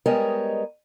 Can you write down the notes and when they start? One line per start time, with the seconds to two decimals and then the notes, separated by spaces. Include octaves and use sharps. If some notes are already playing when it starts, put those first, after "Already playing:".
0.06 G3 G#3 B3 A#4 C#5 D#5